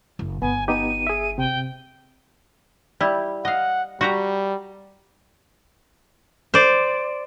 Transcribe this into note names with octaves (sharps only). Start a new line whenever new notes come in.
F#1
G1 B3 G#5
B3 D#4 G4 D#7
G#4 E5
C3 G5
G3 E4
D#5 F5 F#5
G3 F#4 G4 A#5
C5 D5